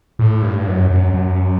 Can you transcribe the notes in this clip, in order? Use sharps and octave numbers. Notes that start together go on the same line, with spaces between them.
A2
G2
F#2
F#2
F#2